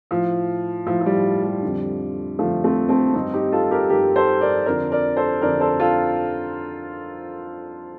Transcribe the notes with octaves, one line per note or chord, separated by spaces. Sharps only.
A2 F3
A2 F3
F3
G3
G3
F2 D3
F2 D3 F3 A3
A3 C4
A3 C4
G2 D#3 C4 D#4
D#4 G4
F4 A4
G4 A#4
G2 D#3 G4 A#4
A4 C5
A#4 D5
F2 D3 A#4 D5
A#4 D5
A4 C5
F2 D3 A#4 D5
A4 C5
F4 A4